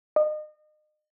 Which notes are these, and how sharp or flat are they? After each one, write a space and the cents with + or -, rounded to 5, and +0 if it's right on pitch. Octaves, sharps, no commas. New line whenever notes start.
D#5 -35